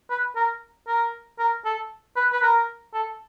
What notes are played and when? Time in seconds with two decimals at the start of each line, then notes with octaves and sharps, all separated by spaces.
0.10 B4
0.36 A#4
0.88 A#4
1.39 A#4
1.65 A4
2.16 B4
2.32 B4
2.42 A#4
2.94 A4